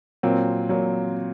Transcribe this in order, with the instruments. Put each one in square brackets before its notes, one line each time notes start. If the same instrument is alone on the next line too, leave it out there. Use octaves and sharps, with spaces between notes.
[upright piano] A#2 F#3 C4
A#2 F#3